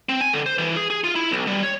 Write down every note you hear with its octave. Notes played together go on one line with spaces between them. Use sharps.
C4
G#5
D3
C5
E3
G#4
G#4
F4
E4
B1
G3
C#5